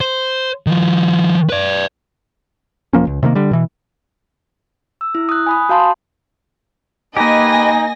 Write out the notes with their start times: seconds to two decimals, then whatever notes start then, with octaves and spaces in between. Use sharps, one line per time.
0.01 C5
0.67 D#3 F3
1.50 B4 D5
2.93 E1 F3 A#3 C#4
3.07 C#2
3.23 C3 D#3 G3 A#3
3.35 D3 G3
3.51 B2 E3
5.01 E6
5.15 E4
5.29 D#6 F#6
5.47 G#5 B5 D#6
5.69 F#4 F5 A5 C6
7.17 A#3 D#4 G4 B4 D#5 G#5 A#6